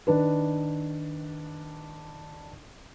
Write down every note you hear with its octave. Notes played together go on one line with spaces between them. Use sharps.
D#3 D4 B4